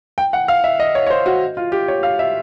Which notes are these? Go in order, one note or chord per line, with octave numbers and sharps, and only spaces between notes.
G5
F#5
F5
E5
D#5
C#5
C#5
C5
F#4
F4
G4
C#5
F5
E5